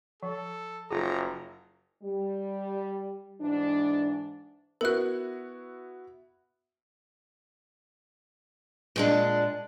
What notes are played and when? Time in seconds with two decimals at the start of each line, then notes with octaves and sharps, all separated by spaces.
0.23 F3 A4
0.91 F#1 F4 G#4 A#5
2.03 G3
3.41 G#2 E3 D4
4.81 B3 E4 F#4 A#4 F#6
8.96 A#2 G#3 D4